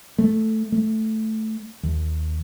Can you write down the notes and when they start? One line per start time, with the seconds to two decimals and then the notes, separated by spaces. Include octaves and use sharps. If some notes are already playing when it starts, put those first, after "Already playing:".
0.18 A3
0.72 A3
1.83 D#2